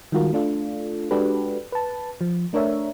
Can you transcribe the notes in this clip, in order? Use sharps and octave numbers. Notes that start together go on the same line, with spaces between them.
D#3 G3 G#3 F4 F#4 A#4
A3 D4 F4 A4
G#3 D4 F#4 G4 A4 B4
B4 A5
F3
A3 D4 A#4 C#5 E5